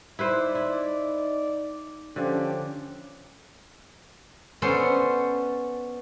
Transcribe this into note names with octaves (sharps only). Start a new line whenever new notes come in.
D#4 E4 B4 C5 D5
E4
D3 F3 C#4 G4
B3 C#4 D4 A4 C5 F#5